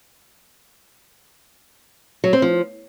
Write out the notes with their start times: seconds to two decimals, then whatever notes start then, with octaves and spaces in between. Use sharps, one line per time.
2.24 F#3
2.33 C4
2.42 F3